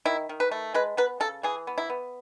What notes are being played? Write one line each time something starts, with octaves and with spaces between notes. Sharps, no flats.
D#3 E4
D#3
B4
A3
G#3 B4
B3 B4
C#3 A4
E3 G#4
B3
E4
B3